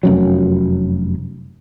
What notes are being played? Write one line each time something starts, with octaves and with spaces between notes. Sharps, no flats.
F1 F#2 F#3